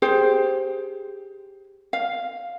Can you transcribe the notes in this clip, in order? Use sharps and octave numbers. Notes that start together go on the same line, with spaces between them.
G4 G#4 C5
F5